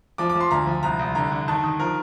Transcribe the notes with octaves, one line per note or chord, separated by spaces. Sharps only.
F3 D6
D6
F3
C6
D2 A#5
F3
C2 A#5
C2
D3 A#5
D3
D#3 A5
D#3
F3 A#4